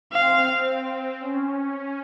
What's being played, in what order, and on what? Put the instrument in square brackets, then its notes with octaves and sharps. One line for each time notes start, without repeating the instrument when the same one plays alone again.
[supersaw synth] C4 [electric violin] F5
[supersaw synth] C4
C#4